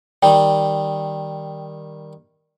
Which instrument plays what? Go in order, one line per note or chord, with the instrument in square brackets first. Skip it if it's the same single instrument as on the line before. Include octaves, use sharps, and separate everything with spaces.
[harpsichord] D#3 G3 [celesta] G5